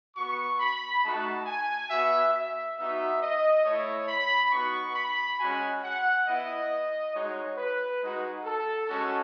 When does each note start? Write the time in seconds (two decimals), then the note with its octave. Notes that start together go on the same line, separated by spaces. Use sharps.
0.16 B3 F#4 C#6
0.59 B5
1.03 A3 D#4 F#4 A5
1.46 G#5
1.90 B3 F#4 E5
2.33 E5
2.77 B3 D#4 F#4 E5
3.21 D#5
3.64 A3 E4 C#5
4.08 B5
4.51 B3 D#4 F#4 C#6
4.96 B5
5.39 G#3 C#4 F#4 G#5
5.83 F#5
6.26 B3 E4 D#5
7.13 G#3 D#4 F#4 C#5
7.57 B4
8.01 G#3 D#4 F#4
8.44 A4
8.88 G#3 C#4 F#4 A4